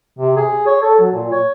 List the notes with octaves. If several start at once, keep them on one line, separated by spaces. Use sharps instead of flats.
C3
G#4
C#5
A4
F#3
A#2
C#5